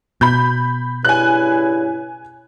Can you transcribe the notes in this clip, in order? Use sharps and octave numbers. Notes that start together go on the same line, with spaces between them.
B2 B5 G6
G2 C#3 E4 G#5 F#6